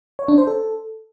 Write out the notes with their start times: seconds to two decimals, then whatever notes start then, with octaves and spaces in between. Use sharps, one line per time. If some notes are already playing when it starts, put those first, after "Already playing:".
0.19 C#5
0.28 D4
0.38 C5
0.47 A4